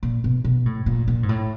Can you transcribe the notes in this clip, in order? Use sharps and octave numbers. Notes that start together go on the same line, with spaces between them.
A#2
B2
B2
A2
A#2
A#2
G#2
A2